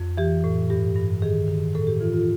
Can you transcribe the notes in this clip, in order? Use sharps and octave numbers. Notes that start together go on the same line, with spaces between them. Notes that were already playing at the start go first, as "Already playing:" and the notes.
Already playing: F2
E3 G4
A2
G2 G4
G2
D#3 G#4
D#3
A2 A4
G4
E3 F4
F4